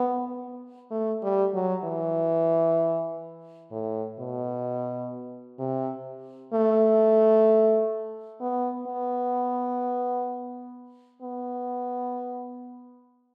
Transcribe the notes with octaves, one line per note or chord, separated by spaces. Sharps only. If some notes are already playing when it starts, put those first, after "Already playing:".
Already playing: B3
A3
G3
F#3
E3
A2
B2
C3
A3
B3
B3
B3